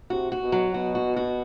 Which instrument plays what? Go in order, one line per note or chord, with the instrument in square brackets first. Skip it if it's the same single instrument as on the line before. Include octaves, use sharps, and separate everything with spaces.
[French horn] C3 [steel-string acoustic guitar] F#4
[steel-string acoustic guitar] F#4
[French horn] B2
[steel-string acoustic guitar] F#3
[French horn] B2 [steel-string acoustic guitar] F#4
[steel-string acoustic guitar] F#4
F#4